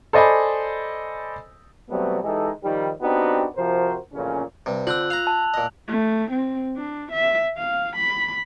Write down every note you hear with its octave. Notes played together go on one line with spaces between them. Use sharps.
A4 C5 D5 D#5 G#5 B5
B2 F#3 G3 A3 B3 C4
E3 G#3 D#4 G4 A4
D#3 F3 G3
B3 C4 D4 D#4 F#4 G4
C3 F3 F#4 A#4 C5
A1 F2 A#2 C#3 C#4
G2 C3
D3 C4 F4 E6 F#6 F#7
F5 A#5 F#6 F7
A5
A#2 D#5
A3
C4
D4
E5
F5
B5